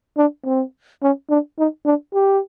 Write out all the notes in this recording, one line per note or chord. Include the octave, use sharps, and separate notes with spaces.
D4
C4
C#4
D4
D#4
D4
G4